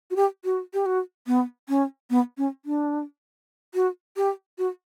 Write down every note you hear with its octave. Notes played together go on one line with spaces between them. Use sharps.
F#4
G4
F#4
G4
F#4
B3
C#4
B3
C#4
D4
F#4
G4
F#4